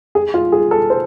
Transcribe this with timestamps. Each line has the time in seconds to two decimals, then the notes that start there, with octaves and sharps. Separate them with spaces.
0.15 G#4
0.34 F4
0.52 G#4
0.71 A4
0.90 C5